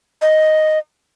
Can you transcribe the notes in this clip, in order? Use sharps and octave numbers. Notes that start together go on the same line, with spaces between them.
D#5